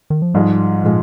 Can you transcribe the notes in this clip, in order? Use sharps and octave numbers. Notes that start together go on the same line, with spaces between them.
D#3
F3
G#2 F3 G3 G#3
A#2 F3 G#3